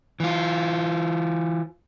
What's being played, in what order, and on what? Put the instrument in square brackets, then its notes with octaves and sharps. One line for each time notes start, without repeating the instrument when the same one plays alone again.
[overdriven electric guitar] E3 F4